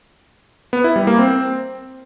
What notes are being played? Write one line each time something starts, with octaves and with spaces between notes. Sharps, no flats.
B3
E4
G3
A#3
C4